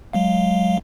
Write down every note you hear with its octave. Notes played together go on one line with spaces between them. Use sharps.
F#3 G#3 F5